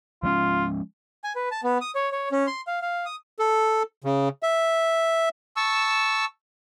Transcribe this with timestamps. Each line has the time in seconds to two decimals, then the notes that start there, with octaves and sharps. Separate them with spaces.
0.23 F3 G#3 C#4 F4
1.24 G#5
1.36 B4
1.51 A5
1.63 B3
1.81 D#6
1.95 C#5
2.12 C#5
2.32 C#4
2.47 C6
2.67 F5
2.82 F5
3.06 D#6
3.39 A4
4.04 C#3
4.43 E5
5.56 A5 C#6 E6